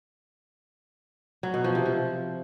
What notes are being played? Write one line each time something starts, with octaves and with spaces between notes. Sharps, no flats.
F#3
B2
F3
C3
F3